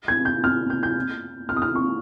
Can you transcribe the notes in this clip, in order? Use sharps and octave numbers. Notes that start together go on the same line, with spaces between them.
G#6
G6
F6
G6
G6
F6
D#6
F6
C#6